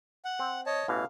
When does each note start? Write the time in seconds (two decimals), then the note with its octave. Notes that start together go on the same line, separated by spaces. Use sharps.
0.25 F#5
0.39 C4
0.66 C#5 D#5 A5
0.88 A1 B2 E3 F5